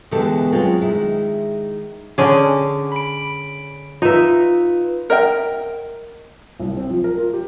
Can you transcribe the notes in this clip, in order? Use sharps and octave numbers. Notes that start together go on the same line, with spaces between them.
B2 D3 E3 G#3 G4 A4
F#3 G#3 C4 C#4 F4
D#3 G#3 E4
D3 C#4 G#4 D6
B5 D7
D#4 F4 B4 E5
A#4 D#5 E5 G5
C2
C4
F3
A#4
F4
G4